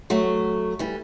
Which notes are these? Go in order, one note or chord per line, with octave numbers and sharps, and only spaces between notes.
F#3 A3
E3 G3